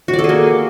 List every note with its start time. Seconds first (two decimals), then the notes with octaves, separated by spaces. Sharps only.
0.08 F#4
0.13 D5
0.19 A4
0.24 G#4
0.29 A#3